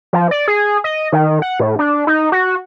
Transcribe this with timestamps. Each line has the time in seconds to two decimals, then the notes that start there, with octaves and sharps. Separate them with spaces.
0.13 F3
0.31 D5
0.48 G#4
0.84 D#5
1.12 D#3
1.42 F#5
1.60 A2
1.79 D4
2.07 D#4
2.32 F#4